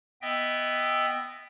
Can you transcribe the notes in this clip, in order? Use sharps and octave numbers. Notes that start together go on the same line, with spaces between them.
B3 D#5 E5 G5 E6